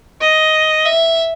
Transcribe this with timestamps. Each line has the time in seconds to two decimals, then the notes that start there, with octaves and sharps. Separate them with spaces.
0.21 D#5
0.85 E5